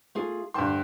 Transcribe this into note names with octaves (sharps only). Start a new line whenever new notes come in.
A3 F4 G#4
D2 G2 G5 A5 C6